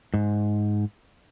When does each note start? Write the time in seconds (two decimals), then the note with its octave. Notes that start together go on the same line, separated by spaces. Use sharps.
0.14 G#2